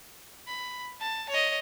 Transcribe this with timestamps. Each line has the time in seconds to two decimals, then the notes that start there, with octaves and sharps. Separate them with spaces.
0.47 B5
1.00 A5
1.29 C#5 D#5